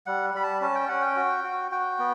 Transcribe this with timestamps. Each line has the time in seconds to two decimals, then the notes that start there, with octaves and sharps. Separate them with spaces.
0.06 G3 F#5
0.34 G3 B5
0.43 A5
0.61 C#4 A5
0.75 G5
0.88 C#4 F#5
1.02 G5
1.16 F#4
1.44 F#4
1.71 F#4 G5
1.99 B3